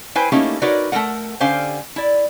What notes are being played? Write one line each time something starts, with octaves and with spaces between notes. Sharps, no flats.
E4 B4 C5 G5 G#5
A3 A#3 C#4 D#4 E4 G4
D#4 F#4 A#4 B4 C#5 D5
A3 D#4 A4 A#4 F#5
D3 C#4 G4 C5 F5 G5
E4 D5